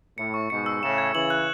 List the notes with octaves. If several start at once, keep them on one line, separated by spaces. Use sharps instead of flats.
A2 C#7
C#6
G#2 B2 C#7
E6
A2 C#3 E7
G#6
C#3 E3 F#7
F#6